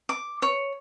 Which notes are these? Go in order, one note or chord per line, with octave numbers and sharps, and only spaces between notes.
D6
C#5